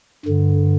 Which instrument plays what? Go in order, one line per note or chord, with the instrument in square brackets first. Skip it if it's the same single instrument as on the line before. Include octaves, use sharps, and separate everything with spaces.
[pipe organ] G2 D3